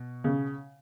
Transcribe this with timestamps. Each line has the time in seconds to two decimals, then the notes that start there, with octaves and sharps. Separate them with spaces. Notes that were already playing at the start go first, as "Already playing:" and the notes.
Already playing: B2
0.24 C#3